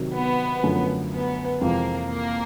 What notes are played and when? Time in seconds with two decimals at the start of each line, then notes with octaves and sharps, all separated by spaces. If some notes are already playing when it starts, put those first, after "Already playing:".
Already playing: C3 D#3 F#3
0.14 B3
0.63 F#2 D3 F3 A3 C#4
1.12 B3
1.61 F2 C3 E3 G#3 A#3 C4
2.10 A#3